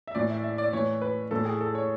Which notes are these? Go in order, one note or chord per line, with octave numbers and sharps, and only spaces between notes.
E5
A2 E3 D5
E5
E5
D5
A2 E3 C#5
B4
A2 E3 A4
G#4
A4
C#5